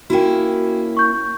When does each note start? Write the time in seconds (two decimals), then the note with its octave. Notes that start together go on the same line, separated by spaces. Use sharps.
0.10 A#3 C#4 E4 F#4 G5
0.97 C#6 G6